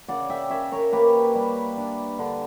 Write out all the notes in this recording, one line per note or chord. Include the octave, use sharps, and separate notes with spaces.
C#3 D5 F#5
E5 G5
C#3 C#5 E5
A#4 C#5
A#3 G4 B4
G3
D4
D3